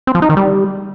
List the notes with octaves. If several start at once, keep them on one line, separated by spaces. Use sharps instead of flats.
C4
F3
D#4
D#3
G3